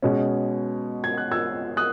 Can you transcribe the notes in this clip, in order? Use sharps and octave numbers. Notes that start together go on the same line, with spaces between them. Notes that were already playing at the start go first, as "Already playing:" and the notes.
B2 G#3 C#4
G#6
F#6
E6 G#6
D#6 F#6